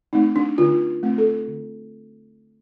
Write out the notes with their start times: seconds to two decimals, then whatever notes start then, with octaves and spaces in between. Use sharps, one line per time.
0.13 A3 C4 D#4
0.36 D4
0.58 D3 F4
1.03 A3 C4
1.18 A4
1.48 D3